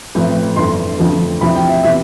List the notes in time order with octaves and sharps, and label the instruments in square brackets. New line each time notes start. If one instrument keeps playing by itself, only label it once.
[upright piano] A1 A2 F3 C4
G1 F2 E3 A3 D4 C6
F2 D3 F3 A3
D2 C3 F3 C4 E4 B5
G5
E5
C3 E3 B3 E5